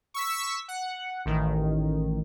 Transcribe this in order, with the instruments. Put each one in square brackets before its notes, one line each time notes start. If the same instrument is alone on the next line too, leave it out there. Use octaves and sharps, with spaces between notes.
[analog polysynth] C#6 E6 B6
F#5
A1 D#3